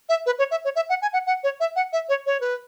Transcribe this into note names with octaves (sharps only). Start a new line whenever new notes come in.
E5
B4
C#5
E5
C#5
E5
F#5
G#5
F#5
F#5
C#5
E5
F#5
E5
C#5
C#5
B4